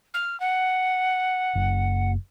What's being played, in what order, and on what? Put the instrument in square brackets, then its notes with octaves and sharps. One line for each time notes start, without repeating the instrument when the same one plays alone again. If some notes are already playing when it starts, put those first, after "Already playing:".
[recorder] F6
F#5
[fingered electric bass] F#1